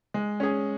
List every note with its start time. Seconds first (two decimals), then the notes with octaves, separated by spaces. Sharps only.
0.14 G#3
0.40 C#4 G#4